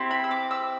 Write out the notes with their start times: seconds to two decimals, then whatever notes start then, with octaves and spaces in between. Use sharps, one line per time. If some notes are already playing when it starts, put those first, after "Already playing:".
Already playing: C4 E4 G4
0.11 B5
0.24 E6
0.31 D6
0.51 E6